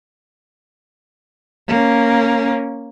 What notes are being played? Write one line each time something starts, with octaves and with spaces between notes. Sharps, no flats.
A#3 C#4